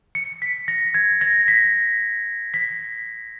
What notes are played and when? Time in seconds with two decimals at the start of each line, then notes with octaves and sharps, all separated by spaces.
0.15 C#7
0.42 B6
0.68 A#6
0.94 G#6
1.21 A#6
1.48 B6
2.54 B6